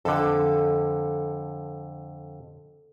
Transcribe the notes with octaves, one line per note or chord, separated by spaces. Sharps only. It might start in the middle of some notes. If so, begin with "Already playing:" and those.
F2 D3 A4